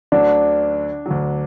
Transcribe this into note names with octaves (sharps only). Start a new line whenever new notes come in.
D2 D3 F#3 D4
D2 D3 F#3